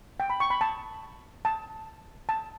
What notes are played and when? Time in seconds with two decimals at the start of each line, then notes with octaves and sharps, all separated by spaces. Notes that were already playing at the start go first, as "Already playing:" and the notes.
0.20 G5
0.30 B5
0.40 C#6
0.50 B5
0.61 A5
1.45 A5
2.29 A5